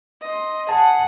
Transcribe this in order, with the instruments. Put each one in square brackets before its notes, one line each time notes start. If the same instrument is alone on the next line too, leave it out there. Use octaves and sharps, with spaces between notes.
[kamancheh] D#5 C6
[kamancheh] G#4 F#5 [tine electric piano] A5